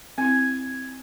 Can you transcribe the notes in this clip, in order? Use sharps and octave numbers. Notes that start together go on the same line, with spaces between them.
C4 E4 G#5